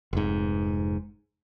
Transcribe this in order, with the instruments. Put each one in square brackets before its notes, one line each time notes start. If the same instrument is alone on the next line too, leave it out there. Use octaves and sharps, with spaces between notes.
[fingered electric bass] F1 G#2